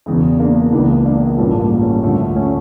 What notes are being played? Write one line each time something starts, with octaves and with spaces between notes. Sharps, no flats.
E1 E2 C#3
A#3 D4
C#2 C#3 E3 A#3 D4
A#3 D4
A1 G2 F3 A3 C#4
G3 A#3
A3 C#4
D2 D3 F3 A3 C#4
A3 C#4